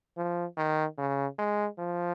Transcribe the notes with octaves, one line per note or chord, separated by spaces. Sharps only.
F3
D#3
C#3
G#3
F3